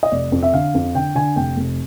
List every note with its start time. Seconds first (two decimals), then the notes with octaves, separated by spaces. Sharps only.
0.03 D#5
0.12 F1 D5
0.32 F2
0.43 E5
0.53 D3 F5
0.75 F2
0.95 D3 G5
1.15 D3 G#5
1.36 F1 G5
1.57 F1